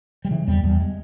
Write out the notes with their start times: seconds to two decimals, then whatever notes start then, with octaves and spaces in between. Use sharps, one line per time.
0.25 G3
0.31 C#3 E3
0.47 E2 G3
0.63 E2 G3
0.80 G#3